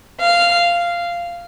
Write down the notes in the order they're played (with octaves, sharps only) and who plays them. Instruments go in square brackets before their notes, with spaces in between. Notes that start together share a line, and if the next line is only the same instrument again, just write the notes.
[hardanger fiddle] F5